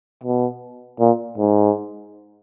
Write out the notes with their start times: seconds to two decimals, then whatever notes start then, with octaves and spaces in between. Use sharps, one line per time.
0.24 B2
1.00 A#2
1.38 G#2